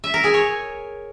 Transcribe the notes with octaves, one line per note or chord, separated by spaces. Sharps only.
E5
A#4
G#4
C#5